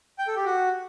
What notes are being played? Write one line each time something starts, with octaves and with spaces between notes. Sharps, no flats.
G5
A4
G4
F#4